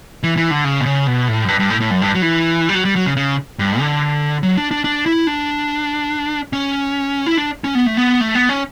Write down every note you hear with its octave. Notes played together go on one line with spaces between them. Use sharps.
E3
E3
D3
C#3
B2
C#3
B2
A2
F#2
G2
G2
A2
A2
F#2
G2
F#3
E3
G3
F#3
G3
F#3
C#3
C#3
G2
D3
F#3
D4
D4
D4
E4
D4
C#4
E4
D4
C#4
B3
A3
B3
A3
B3
C#4